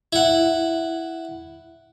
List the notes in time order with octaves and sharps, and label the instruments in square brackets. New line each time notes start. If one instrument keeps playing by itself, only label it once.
[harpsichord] E4 F#5